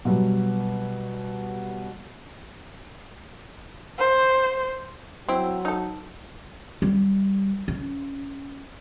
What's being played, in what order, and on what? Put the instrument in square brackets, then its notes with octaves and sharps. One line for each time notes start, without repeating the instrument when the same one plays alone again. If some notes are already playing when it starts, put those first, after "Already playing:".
[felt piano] B2 F#3 G3
[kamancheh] C5
[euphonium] F#3 [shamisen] C4 E4
[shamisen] D#4 A4
[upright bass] G3
C#4